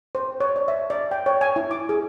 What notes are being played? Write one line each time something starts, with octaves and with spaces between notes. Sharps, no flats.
C5
C#5
D5
E5
D5
G5
C#5
G#5
E4
D6
G#4